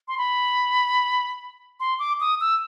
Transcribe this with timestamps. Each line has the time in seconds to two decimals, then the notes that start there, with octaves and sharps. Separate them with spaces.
0.08 C6
0.18 B5
1.80 C6
1.99 D6
2.21 D#6
2.41 E6